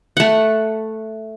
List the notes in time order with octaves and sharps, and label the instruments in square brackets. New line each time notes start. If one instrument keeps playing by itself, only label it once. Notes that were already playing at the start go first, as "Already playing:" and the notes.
[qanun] A3 F#5